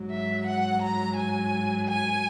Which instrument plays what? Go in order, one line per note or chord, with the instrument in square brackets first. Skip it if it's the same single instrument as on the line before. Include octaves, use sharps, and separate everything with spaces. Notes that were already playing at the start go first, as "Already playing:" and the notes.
Already playing: [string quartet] G#2 F#3
E5
F#5
A#5
G#5
G#5